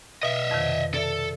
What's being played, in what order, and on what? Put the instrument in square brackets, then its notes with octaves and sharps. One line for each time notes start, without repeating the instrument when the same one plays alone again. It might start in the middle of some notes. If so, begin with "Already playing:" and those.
[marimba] B2 [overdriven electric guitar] D#5 E5
[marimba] F2 C3 D#3
[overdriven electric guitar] A4 [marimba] D5 E5